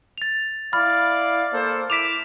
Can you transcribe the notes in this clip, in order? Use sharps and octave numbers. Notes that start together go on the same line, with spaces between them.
A6 F7
E4 D5 F5 B5 F6 A6
A#3 A4 C5
E4 D6 B6 E7 F7